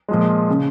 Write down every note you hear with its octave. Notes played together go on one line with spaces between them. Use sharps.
A#2 F3 G#3
C#3